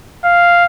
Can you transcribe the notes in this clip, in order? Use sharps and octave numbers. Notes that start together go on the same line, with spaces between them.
F5